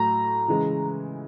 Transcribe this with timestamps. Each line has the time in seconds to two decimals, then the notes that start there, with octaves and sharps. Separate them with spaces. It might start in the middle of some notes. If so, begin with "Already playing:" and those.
Already playing: A2 F#3 A3 A#5
0.48 C#3 E3 G#3